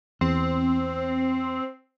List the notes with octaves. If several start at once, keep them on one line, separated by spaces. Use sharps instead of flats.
E2 C4